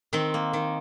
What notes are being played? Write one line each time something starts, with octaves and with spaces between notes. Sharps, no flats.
D#3 C4
A#3
D#3